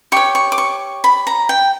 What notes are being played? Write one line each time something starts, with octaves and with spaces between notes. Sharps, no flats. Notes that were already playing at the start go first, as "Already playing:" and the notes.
G4 C#5 C#6
C#6
D6
C#6
B5
A#5
G5